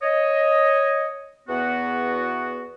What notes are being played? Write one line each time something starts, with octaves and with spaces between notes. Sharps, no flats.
C#5 D#5
E2 B3 F#4